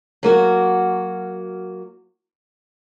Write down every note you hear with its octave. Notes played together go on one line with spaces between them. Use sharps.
F#3 A#3 F#4